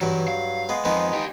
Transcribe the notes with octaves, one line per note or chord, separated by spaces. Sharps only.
G2 E3 F#3
F5
G#3 B3
F2 D#3 G#3 B3
D#4 G4